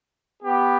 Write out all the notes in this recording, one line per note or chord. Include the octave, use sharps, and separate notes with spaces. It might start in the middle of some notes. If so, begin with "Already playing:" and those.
B3 G4